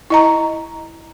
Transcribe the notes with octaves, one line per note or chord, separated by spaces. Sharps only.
E4 D#5 A#5